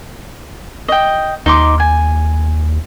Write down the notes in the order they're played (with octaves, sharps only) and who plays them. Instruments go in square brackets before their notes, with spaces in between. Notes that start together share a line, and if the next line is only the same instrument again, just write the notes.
[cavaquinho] D#5 G5
[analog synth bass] D#2 [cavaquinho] D#4 C6 D6
[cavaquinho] G#5